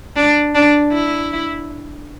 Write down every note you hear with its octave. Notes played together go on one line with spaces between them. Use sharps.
D4
D4
E4